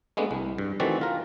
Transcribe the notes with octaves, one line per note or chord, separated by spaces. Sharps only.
G#3 A3 B3 D4
C2
G2
D#3 E3 A3 C4 F#4 D5
F4 A#4